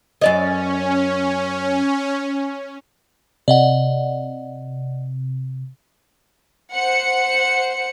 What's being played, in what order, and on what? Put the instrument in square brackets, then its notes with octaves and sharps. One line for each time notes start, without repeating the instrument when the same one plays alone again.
[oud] F#2 D5 D#5 [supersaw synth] C#4
[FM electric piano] C3 [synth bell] D5 D#5 F#5
[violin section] C5 F#5 C#7